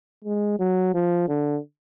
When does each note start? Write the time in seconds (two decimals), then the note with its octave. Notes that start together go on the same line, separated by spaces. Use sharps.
0.24 G#3
0.59 F#3
0.94 F3
1.29 D3